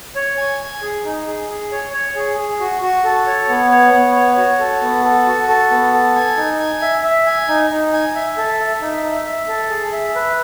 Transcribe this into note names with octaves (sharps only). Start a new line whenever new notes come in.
C#5
G#5
G#5
G#4
D#4
G#4
G#4
C#5
C#5
G#4
G#4
F#4
F#4
A4
C#5
B3
C#5
B3
C#5
F#4
A4
B3
A4
F#4
A4
B3
A4
G#5
D#4
G#5
E5
E5
G#5
D#4
D#4
G#5
E5
A4
E5
D#4
E5
E5
A4
G#4
E5
B4